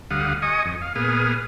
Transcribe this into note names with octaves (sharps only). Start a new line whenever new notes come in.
D2 G3 F5 F#5 D#6
D#5 G#5 C#6 D#6
F2
F5
A#2 B3 G#4 D#6 F6